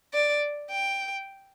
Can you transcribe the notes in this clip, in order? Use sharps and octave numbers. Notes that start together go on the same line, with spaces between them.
D5
G5